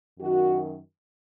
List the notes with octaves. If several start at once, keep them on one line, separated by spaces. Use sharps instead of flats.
F#2 D#3 F#4